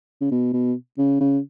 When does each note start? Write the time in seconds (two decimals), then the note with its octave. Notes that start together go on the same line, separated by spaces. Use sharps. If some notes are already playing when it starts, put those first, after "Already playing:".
0.21 C#3
0.31 B2
0.53 B2
0.98 C#3
1.20 C#3